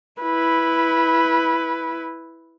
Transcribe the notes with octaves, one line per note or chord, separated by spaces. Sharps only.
E4 B4